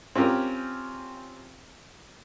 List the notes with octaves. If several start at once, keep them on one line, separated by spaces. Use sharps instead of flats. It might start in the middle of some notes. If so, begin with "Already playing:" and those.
C4 C#4 F4 G4 A#4